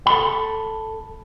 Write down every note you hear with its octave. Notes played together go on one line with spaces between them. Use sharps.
A4 B5